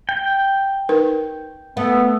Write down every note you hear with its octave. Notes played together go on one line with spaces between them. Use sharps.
G5
D#4 A#4 B4
A3 B3